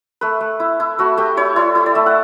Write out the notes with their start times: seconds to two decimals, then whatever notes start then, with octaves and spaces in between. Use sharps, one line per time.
0.21 A3 B4
0.40 A3
0.60 E4
0.80 E4
0.99 A3 F#4
1.17 A3 G4
1.37 E4 C#5
1.56 E4 D5
1.75 E4
1.86 D5
1.95 A3 E5
2.06 F#5